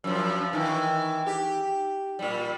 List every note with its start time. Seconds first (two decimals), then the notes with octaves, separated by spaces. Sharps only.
0.04 F#2 F3
0.53 D#3 E3
1.27 G4
2.19 A#2 G3